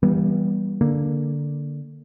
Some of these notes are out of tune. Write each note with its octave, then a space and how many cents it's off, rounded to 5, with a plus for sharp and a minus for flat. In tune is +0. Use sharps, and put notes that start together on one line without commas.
E3 +10 G3 +0 B3 -35
D3 +0 A#3 +0